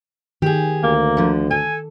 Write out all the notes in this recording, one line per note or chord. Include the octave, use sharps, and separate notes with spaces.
D#3 G4 G#4
D2 A#3
D3 F3
A4 G#5